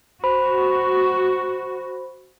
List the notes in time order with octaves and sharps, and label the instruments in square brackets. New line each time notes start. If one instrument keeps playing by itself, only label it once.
[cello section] F#4 [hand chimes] C5 B5